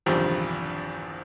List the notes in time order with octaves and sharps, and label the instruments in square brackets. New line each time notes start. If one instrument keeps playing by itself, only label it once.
[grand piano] A#1 E2 G2 C3 D#3 F3